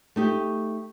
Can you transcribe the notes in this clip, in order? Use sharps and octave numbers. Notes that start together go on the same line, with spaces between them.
A3 D#4 G4